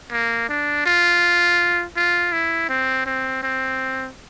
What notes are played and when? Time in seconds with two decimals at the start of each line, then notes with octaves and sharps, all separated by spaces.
0.12 A#3
0.49 D4
0.86 F4
1.96 F4
2.32 E4
2.69 C4
3.06 C4
3.43 C4